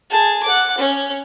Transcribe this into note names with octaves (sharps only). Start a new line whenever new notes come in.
G#4 A5
F#5 D6
C#4